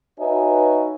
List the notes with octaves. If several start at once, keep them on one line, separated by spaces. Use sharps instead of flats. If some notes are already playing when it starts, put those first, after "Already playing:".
D#4 F#4 B4 C#5 E5 G#5